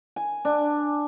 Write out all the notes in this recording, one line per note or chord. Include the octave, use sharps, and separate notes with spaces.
G#5
D4